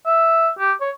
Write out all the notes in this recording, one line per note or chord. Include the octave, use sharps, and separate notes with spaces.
E5
G4
C#5